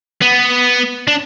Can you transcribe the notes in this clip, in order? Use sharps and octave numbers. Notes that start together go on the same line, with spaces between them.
B3
D4